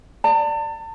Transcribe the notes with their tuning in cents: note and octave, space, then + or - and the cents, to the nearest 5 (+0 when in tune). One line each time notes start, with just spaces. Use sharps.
D5 +0 A5 +45